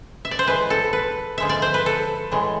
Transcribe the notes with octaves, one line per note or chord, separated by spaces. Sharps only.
E5
D5
C5
A2 E3 G#3 B4
A4
B4
D3 F3 G#3 E5
D5
C5
B4
A4
A2 E3 G#3